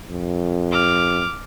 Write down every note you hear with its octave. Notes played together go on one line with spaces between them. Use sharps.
F2
D6 F6